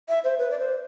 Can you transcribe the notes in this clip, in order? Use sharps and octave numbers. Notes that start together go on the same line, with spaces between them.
E5
C5
B4
D5
C5